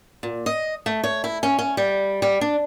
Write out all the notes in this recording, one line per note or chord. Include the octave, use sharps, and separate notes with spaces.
A#2
D#5
A3
C#5
E4
C#4
C#4
G3
G3
D4